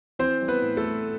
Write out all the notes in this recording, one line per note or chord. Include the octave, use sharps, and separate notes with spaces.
E3 C4 C5
G3
B3 B4
A2
A3 A4
A2